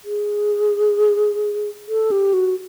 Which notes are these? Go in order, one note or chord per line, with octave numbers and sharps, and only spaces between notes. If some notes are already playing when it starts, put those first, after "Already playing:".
G#4
A4
G4
F#4